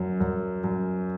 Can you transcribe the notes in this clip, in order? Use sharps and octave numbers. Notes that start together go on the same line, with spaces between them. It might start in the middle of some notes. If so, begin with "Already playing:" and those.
Already playing: F#2 F#3
F#2
F#2